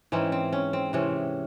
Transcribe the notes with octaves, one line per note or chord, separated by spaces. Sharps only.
G#2 E3 C4 C#4
C4
C#4
C4
C3 E3 C4 C#4